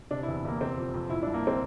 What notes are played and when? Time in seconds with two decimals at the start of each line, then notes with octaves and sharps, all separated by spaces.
0.11 C3 D4
0.23 E4
0.28 E2
0.36 E4
0.45 E2 A#3
0.61 C3 C4
0.78 F2
0.94 F2
1.10 A#2 E4
1.23 D4
1.26 C2
1.34 A#3
1.47 C4